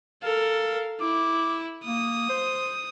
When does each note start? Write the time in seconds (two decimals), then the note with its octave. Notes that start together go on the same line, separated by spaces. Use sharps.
0.23 A4 A#4 F5
1.01 E4 D6
1.85 A#3 D#6
2.29 C5